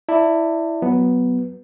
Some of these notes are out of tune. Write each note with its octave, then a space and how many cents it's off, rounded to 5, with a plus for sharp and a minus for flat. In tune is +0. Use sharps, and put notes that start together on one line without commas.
E4 +0 D5 +0 A5 +30
F#3 +0 B3 +0